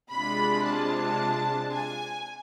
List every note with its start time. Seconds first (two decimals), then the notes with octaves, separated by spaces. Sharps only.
0.11 C3 G#3 D4 F4 B5
0.64 A5
1.71 G#5